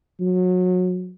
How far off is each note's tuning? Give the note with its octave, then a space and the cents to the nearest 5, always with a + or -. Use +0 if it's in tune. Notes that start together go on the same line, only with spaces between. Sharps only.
F#3 -25